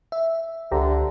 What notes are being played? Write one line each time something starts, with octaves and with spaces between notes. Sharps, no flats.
E5
C#2 D3 G4 C5 A#5